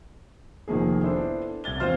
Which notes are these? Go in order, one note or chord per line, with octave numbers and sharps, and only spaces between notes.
F1 D#3 F3 A#3 G#4
B3 D4 E4 A4 C5
C2 G#6 A6 G7
E2 C4 F4 C5 C6 F6